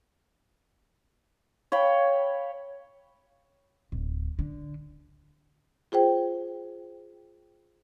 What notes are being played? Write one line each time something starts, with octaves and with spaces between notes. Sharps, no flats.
C#5 F5 G5 B5
D1
D3
F4 G#4 C5 G5